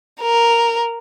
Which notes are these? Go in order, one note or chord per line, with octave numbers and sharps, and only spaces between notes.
A#4